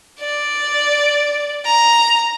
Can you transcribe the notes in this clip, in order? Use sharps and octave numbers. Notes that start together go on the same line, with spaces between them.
D5
A#5